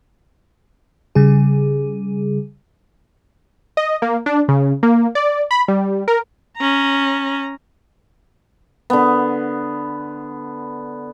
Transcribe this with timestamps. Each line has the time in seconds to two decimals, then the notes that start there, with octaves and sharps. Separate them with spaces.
1.15 C#3 G3 G#4
3.77 D#5
4.02 A#3
4.26 D4
4.48 C#3
4.83 A#3
5.15 D5
5.51 B5
5.68 G3
6.08 A#4
6.57 C#4 A#5
8.90 D3 B3